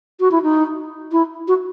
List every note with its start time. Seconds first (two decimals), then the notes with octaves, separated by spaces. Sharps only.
0.20 F#4
0.31 E4
0.43 D#4
1.12 E4
1.48 F#4